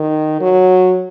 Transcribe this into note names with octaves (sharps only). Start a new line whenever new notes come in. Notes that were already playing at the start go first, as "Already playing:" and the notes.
Already playing: D#3
F#3